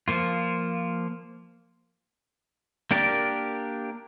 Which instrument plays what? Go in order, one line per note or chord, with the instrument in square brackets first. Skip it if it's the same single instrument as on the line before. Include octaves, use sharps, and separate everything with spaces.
[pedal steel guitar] F3 A#3 F4
A#3 D4 G4 A#4 D5